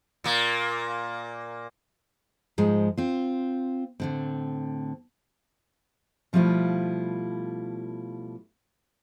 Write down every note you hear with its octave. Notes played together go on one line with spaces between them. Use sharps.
A#2 A#3
G#2 F3 G#3
C4 F4
A2 D3 C4
B2 F3 G3 A3 E4 F4